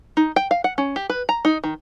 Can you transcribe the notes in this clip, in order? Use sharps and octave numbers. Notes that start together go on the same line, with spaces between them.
D#4
G5
F5
F#5
C#4
G4
B4
A#5
D#4
D#3